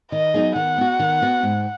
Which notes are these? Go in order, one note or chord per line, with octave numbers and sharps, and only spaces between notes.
D#3 D#5
F#3 B3 D#4 G#4
D#3 F#5
B3 F#4
D#3
B3 F#4
G#2